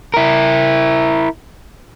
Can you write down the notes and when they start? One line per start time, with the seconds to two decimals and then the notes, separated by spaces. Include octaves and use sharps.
0.14 E4 A#4